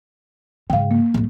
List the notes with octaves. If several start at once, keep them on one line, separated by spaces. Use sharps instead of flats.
G#2 C#3 F5 G5
A#3
D1 G3